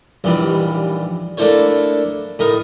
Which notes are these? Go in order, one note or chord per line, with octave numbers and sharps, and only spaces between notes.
A#1 D#2 E3 G3
A3 A#3 D4 E4 C5 C#5
A2 D#4 A#4